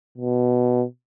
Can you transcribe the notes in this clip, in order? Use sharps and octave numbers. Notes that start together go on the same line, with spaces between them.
B2